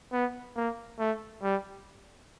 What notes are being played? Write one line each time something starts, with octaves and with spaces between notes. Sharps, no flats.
B3
A#3
A3
G3